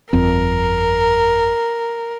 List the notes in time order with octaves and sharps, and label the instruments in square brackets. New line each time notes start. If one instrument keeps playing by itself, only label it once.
[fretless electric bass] G1 F2 C4 [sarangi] A#4